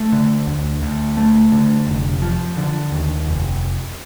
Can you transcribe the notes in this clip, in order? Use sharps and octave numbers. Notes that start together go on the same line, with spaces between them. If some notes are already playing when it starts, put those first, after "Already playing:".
Already playing: A3
D3
D2
D2
A3
D3
F1
F3
D3
D#2
F1